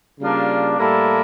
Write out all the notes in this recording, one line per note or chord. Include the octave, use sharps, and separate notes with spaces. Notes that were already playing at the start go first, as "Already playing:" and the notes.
C#3 G3 A#3 D4 F4
A2 G3 A#3 E4 A4